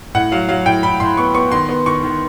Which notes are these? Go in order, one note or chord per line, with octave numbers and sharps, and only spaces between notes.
A2 F#5
F#3 F5
F#3 F5
A2 G5
A2 B5
A2 C6
B3 C#6
B3 C#6
D#3 C6
B3
D#3 C#6
D#3